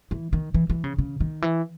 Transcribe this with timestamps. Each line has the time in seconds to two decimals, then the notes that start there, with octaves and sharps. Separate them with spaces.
0.11 E3
0.33 D#3
0.54 E3
0.70 E3
0.84 C#3
0.98 C#3
1.20 D#3
1.42 E3